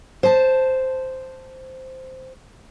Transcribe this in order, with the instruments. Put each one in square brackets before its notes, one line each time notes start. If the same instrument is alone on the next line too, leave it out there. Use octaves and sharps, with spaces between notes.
[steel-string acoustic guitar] C5 A5